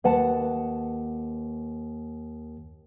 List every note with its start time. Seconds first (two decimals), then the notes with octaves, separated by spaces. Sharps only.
0.04 D#2 B4 F#5 A5